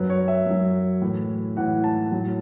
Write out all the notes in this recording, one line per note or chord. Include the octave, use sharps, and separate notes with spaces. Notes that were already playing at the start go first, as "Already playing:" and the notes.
Already playing: F#2 F#3 B4
C#5
E5
F#2 F#3
A2 E3
A2 E3 F#5
A5
A2 F#3